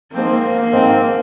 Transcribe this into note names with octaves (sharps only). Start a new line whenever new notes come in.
G#2 F3 A#3 C4
G#2 F3 C4